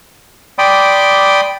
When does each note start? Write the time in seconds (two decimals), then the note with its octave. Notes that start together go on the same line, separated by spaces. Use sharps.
0.59 D5 G5 B5 C6 D6 D#6